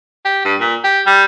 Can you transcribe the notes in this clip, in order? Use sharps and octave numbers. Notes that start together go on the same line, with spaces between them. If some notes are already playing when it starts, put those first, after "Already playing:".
G4
G2
A#2
G4
G3